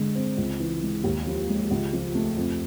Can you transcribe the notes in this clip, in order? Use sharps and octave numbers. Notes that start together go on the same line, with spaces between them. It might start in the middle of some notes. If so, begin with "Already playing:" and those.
Already playing: D3 G#3
C4
C#2
E3
G#3
D#2
F3
G#3
C#2
F3
A3
F2